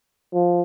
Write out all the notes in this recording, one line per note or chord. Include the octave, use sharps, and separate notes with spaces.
F3